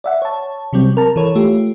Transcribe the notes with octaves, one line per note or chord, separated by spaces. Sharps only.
D5 E5 F#5
C#5 A5
C3 F#3 G3 C4
A#4 A5 A#5
E3 A4 C#5
A3 F4 G4